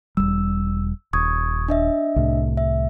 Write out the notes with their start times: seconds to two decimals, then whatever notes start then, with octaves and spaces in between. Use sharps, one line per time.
0.17 E1 A#1 G3 E6
1.13 D#1 C#6 D#6 G#6
1.68 D4 D#5 E5
2.16 C2 A2
2.57 E5